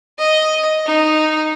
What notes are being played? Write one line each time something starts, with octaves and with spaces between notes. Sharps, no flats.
D#5
D#4